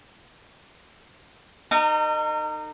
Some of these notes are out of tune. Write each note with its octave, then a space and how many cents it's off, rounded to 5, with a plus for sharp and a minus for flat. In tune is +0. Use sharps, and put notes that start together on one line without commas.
D#4 -25 A#4 -45